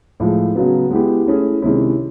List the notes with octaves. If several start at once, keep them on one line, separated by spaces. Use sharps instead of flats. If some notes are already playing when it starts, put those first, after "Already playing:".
A2 F3 G#3
C#3 F#3 B3
G#3 B3 E4 G4
A3 C#4 E4 G#4
C3 D#3 G#3 C#4 E4